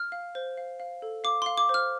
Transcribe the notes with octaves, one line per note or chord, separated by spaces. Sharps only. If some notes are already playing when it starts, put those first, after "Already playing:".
Already playing: F6
F5
C5
F5
F5
A4
F5 D6
F5 C6
D6
C5
F6